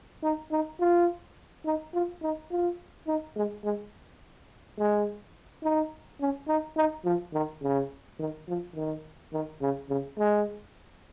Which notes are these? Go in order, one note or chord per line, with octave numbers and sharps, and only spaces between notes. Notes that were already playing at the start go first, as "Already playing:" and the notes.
D#4
D#4
F4
D#4
F4
D#4
F4
D#4
G#3
G#3
G#3
D#4
C#4
D#4
D#4
F3
D#3
C#3
D#3
F3
D#3
D#3
C#3
C#3
G#3